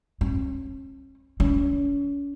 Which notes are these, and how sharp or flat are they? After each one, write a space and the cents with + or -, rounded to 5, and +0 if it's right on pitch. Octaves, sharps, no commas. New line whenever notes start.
C#4 -35
C#4 +35